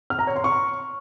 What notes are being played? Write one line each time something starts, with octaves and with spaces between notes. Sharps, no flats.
F6
A#5
C#5
C6
C#6